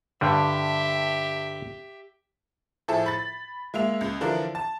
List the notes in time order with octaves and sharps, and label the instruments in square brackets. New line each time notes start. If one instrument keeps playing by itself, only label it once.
[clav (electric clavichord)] G2 D3 G3 [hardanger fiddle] G4 E5
[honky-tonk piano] A2 F3 E4 G#4 A4
B5 A6
G#3 A#3 E5 F7
C#2
D3 E3 F3 D4 F4 A#4
A5